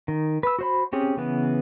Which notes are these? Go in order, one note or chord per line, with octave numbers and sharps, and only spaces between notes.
D#3
B4 E6
F#4 C5 B5
C4 C#4 G4 G#4
C#3 E3 B3